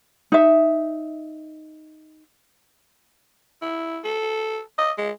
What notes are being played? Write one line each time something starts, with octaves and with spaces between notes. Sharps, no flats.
D#4 E5
E4
A4
D#5
G#3